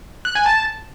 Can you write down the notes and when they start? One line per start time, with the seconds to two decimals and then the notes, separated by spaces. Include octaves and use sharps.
0.25 F#6
0.35 G#5
0.46 A5